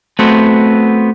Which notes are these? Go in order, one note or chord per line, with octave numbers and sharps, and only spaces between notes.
A3 B3 C4 F#4